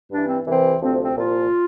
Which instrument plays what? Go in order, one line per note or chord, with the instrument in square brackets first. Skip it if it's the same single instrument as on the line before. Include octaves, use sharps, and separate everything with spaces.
[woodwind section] G2 E3 D4
C4
C2 C3 E3 C4
D2 C3 F3 C4
C4
C2 A#2 F3 F4